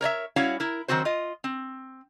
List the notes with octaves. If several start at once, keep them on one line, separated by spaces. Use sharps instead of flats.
A#4 C#5 D5 E5
G3 C#4 E4 F#4 C#5 F5
E4 A#4
D#3 F#3 C4 F#4 C5
F4 D#5
C4